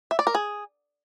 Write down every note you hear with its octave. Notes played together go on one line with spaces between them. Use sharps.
E5
D5
A#4
G#4